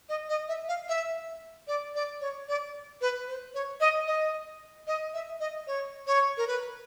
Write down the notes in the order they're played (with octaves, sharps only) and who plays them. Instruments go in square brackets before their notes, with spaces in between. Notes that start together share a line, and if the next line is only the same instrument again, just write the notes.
[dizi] D#5
D#5
E5
F5
E5
D5
D5
C#5
D5
B4
C5
C#5
D#5
D#5
D#5
E5
D#5
C#5
C#5
A#4
B4